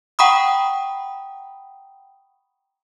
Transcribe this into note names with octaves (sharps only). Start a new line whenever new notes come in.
F#5 G5 A#5 B5 C#6 D#6